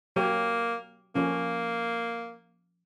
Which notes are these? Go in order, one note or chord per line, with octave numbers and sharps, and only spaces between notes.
F#3 A#3 G4 C#5
F3 A#3 C#4